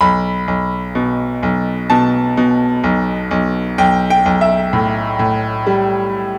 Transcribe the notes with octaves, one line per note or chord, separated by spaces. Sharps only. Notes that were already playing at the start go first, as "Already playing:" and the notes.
B1 B5
B1
B2
B1
B2 A5
B2
B1
B1
B1 G5
G5
B1
E5
A2
A2
G3